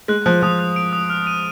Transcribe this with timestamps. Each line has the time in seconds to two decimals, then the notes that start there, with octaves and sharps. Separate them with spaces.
0.08 G#3 F#6
0.26 F3 F#6
0.42 F3 D#6
0.59 F#6
0.76 D7
0.93 D#6
1.10 F6
1.27 D#7